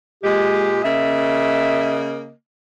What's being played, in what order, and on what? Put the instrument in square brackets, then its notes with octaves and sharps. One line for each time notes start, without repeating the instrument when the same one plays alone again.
[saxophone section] A#2 G#3 [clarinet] G4
[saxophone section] C#3 A#3 D#5 [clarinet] E5